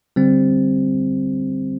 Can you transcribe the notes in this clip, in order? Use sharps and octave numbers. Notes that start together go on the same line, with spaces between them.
D3 G3 C4